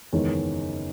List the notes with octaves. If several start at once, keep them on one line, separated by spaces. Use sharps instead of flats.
F#1 E2 D#3 G#3 C#4